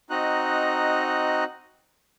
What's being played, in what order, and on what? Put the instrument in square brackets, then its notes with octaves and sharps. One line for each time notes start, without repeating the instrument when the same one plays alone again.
[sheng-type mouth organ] C4 D#4 F#4 D#5 A#5 F#6